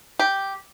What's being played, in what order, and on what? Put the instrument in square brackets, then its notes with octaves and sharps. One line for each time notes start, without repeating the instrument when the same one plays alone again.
[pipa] G4